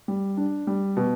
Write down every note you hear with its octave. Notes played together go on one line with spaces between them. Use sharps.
G3
D4
G3
B2